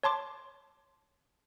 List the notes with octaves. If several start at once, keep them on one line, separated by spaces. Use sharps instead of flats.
C#5 A5 C6 D6